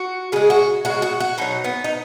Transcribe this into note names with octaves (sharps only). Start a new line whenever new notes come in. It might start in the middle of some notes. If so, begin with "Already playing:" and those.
Already playing: F#4
C#3 G#3 G#4
F#4
C#3 G#3 F#4
F#4
F#4
B2 F#3 D#4
B3
D#4